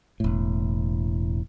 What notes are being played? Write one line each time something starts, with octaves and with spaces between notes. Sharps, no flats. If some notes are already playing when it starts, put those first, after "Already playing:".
E1 A2